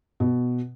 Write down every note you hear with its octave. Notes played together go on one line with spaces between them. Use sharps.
B2